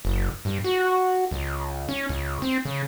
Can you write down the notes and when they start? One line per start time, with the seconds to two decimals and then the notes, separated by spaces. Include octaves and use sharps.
0.05 F#1
0.45 G2
0.64 F#4
1.31 C#2
1.89 C#4
2.09 C#2
2.42 C4
2.65 C#3